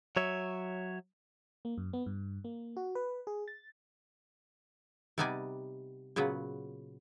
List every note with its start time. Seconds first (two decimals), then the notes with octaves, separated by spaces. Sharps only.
0.16 F#3 C#5 E5
1.65 A#3
1.78 F#2
1.93 B3
2.06 G2
2.44 A#3
2.77 F#4
2.95 B4
3.27 G#4
3.48 A6
5.18 C3 G3 B3 D#4 D5 G#5
6.16 A#2 C#3 F#3 B3